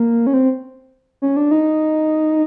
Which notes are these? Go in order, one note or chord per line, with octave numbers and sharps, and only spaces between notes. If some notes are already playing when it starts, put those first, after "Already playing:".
Already playing: A#3
C#4
C4
C#4
D4
D#4